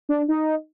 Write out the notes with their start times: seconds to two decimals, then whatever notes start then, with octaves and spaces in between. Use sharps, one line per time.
0.09 D4
0.28 D#4